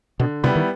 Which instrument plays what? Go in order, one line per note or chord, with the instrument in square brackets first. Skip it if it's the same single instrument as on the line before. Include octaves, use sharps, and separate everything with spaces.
[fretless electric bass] B2 [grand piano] D3
[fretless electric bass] C3 [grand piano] G3 B3 E4
[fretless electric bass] D#3